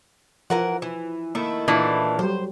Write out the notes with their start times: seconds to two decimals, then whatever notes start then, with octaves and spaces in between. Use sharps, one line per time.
0.50 E3 F3 A#4 F#5
0.82 E3
1.35 D#3 A3 A#3 E4
1.68 A#2 E3 D4
2.19 F#3 G3 C5